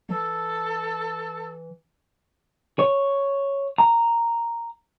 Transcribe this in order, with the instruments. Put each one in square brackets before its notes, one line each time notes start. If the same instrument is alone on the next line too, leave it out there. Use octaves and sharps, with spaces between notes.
[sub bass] E3 [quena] A4
[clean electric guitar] C#5
A#5